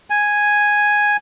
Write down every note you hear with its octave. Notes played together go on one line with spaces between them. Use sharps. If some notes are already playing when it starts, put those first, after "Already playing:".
G#5